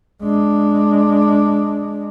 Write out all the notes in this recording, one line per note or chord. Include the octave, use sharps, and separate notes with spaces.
G#3 D4